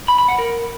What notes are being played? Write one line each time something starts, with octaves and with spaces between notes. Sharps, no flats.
B5
B5
F#5
A#4